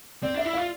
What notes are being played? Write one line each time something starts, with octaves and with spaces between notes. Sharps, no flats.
C4 D5
D4 E5
E4
F4 F5